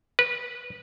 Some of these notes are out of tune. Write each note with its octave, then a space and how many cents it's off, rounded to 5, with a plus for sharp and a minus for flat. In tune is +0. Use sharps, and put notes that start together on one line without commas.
B4 -15